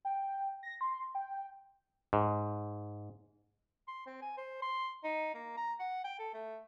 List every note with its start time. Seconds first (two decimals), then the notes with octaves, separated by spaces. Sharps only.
0.05 G5
0.63 A#6
0.81 C6
1.15 G5
2.13 G#2
3.88 C6
4.07 C4
4.22 G#5
4.37 C5
4.62 C6
5.04 D#4
5.34 A#3
5.57 A#5
5.80 F#5
6.05 G5
6.19 A4
6.34 A3